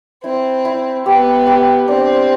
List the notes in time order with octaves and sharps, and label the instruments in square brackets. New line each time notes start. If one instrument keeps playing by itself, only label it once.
[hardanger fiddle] C4 [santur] E4
[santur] E4
[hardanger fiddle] B3 [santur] G4
[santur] G4
[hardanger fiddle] C4 [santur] D4